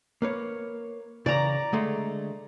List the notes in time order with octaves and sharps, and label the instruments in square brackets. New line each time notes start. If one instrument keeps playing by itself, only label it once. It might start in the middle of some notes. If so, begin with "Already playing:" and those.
[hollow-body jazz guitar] A#3 B4 C#5
[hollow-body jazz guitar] C#3 E3 [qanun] D5 A#5
[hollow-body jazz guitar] D3 G#3 A3